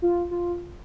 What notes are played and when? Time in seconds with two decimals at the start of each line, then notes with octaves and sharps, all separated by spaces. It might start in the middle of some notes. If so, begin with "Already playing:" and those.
0.02 F4
0.31 F4